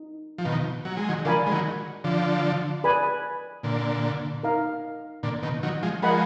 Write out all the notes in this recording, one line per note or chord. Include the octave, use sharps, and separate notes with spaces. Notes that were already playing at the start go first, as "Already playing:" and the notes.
Already playing: D#4
F3
B2 D#3
F#3
G#3
D#3 F#3
D3 F3 A#4 D5 G#5 B5
G#3
D#3 F#3
D3 F3
G#4 B4 D5 G#5 B5
A#2 D3
D#4 A#4 F5 A#5
A#2 D3
B2 D#3
D#3 F#3
F3 G#3
F3 G#3 A#4 D#5 F#5 B5